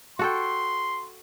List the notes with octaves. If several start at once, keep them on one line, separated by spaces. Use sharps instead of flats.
F#4 A4 G5 C6